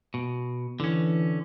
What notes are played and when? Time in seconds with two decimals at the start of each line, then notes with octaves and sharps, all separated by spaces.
0.14 B2
0.80 D3 E3 C#4